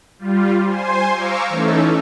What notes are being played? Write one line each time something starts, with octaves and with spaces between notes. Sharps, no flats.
G3 F4
C5 G#5 C6
F5 A#5 C#6 D6 E6
E3 A3 C#4 D#4 A4